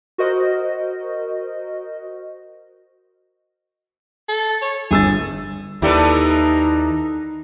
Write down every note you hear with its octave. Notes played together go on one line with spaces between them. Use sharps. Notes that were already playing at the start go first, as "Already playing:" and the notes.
F#4 A#4 C5 D#5
A4
C#5
G1 G#4 E6 A6
D#2 A#3 D#4 E4 G4 A4 B4 D5